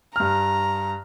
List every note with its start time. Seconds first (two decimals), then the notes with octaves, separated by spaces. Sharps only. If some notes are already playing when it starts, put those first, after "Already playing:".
0.16 G2 A#5 F6